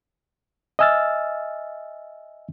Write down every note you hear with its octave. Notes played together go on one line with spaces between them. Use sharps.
D#5 E5 G#5 E6 F6 A6